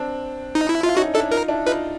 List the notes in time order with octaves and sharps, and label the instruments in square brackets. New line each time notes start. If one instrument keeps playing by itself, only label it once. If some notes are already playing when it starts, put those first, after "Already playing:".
Already playing: [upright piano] C4 D4
[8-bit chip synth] D#4
E4
[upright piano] E4 [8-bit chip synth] F4
[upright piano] C#4 D#4 [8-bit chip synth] F#4
[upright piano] D4 E4 [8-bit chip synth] A4
[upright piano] D#4 F4 [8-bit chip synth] A#4
[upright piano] D4 E4
[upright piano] D#4 F4 [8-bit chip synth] B4